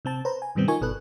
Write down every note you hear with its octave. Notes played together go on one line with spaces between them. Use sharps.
C3 C4 A5
B4 C5 A#5
G#5
G#2 C3 D#3 G3 B3 C4
D#4 F4 A#4 G#5 C#6
G1 B2 A4 B4 F#6